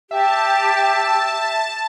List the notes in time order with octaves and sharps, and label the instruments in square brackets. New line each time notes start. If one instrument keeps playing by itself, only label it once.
[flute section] G4 [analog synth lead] E5 [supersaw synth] A5